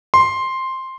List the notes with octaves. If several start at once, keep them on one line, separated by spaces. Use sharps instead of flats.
C6